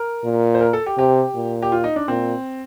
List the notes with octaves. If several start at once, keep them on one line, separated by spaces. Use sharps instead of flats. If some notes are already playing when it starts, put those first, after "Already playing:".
Already playing: A#4
A#2
C5
A#4
A4
G4
C3 G4
A#2
G4
F4
D#4
D4
A#2 C4